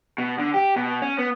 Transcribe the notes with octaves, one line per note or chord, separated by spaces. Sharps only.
B2
D3
G4
B2
C#4
B3